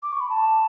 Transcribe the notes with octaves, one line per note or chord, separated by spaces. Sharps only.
D6
C#6
B5
A5